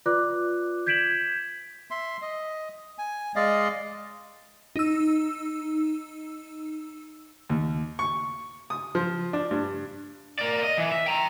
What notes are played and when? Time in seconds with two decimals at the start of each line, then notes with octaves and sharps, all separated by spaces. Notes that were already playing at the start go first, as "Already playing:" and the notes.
0.06 F4 B4 D5 D6 F#6
0.86 G6 G#6 B6 D7 E7 F#7
1.91 E5 C6
2.22 D#5
2.98 G#5
3.36 G#3 D5 D#5 F5
4.76 D#4 E6
7.50 D#2
7.99 C#6
8.70 D#6
8.95 F3
9.33 D4
9.51 G2
10.39 A#4 D5
10.63 D#5
10.78 E3
10.92 E5
11.06 G5 A#5